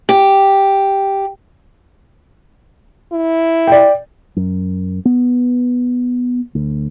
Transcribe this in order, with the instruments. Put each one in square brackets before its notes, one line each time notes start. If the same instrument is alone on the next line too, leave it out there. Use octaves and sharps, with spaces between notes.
[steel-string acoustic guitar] G4
[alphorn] E4
[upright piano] D5 G5
[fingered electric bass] F#2
B3
D2